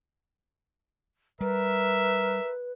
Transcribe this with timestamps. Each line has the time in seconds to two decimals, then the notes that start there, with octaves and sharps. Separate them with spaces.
1.41 G3 A#4 B4 E5